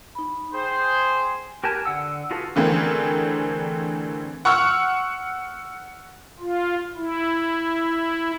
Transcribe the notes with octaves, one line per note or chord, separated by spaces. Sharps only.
D#4 B5
G#4 C5 G5
G4 A#4 B4 G#5 A5
D3 F#5 E6
F4 F#4 G#4 A4 B4
D3 E3 A3 C4 G#4 A#4
F#5 C#6 E6 F6
F4
E4